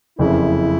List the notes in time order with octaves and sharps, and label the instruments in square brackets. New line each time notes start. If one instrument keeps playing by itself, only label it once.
[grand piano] F#1 F2 C#3 [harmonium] E4